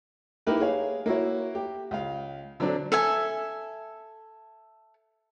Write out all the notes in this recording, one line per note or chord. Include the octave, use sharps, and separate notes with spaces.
A#3 D#4 E4 G4 A#4 B4
G#4 C#5 F5
A#3 E4 F#4 C#5
G4
C#2 F5
D3 F#3 C4 D4
A4 E5 G#5